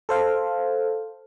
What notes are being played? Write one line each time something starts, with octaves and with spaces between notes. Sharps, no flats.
A4 C5 F5